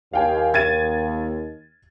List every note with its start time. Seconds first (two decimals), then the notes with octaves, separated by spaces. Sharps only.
0.13 D#2 F5 G5 G#5
0.54 G#6 A6 D#7